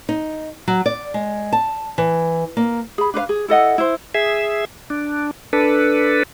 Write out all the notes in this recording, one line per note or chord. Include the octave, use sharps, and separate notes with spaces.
D#4
F#3
D5
G#3
A5
E3
A#3
G#4 B5
D4 B4 C5 F5
G#4
E4 A4 D#5 F#5
E4 C5
G#4 E5
D4
D4 A4 B4